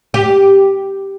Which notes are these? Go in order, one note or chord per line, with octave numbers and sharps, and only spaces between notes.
G4